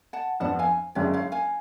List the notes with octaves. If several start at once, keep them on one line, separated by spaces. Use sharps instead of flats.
F#5 A5
F2 F3 B3 D4 F#5 A5
F5 G#5
F#1 F#2 D3 G#3 D4 C#5 F5
C#5 F5
F5 G#5